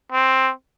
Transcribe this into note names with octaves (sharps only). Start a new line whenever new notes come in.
C4